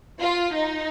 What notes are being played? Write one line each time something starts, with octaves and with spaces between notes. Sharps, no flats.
F4
D#4